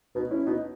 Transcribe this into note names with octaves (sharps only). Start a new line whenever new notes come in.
B2 B3 D#4
C#4 E4
B2 B3 D#4